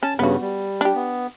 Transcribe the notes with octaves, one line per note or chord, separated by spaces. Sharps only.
C#4 A5
G2 C#3 B3 F#4
G3
D4 G4
B3